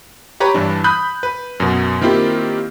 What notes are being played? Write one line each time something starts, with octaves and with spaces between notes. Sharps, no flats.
G4 B4 C#5 A#5 B5
G2 E3 D4
B5 D#6 F#6 G6
B4
F#2 B2
D#3 A#3 C4 E4 F4 G4